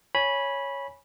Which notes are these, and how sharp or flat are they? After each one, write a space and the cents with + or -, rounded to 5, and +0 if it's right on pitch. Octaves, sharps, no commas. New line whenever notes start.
C#5 +0 G#5 +0 B5 -15